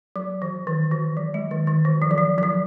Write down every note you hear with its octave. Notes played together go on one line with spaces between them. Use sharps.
F#3
E3
D#3
E3
F#3
G#3
D#3
D#3
E3
F3
F#3
F3
F#3
F3